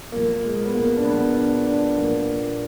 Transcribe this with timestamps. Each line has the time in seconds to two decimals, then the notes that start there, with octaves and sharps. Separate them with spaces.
0.12 A#2 F3 A#3
0.43 G#3
0.65 B3
0.74 A#3
0.97 D4
1.05 A#2 F3 B3
1.36 D4
1.67 D4
1.98 A#2 F3 A#3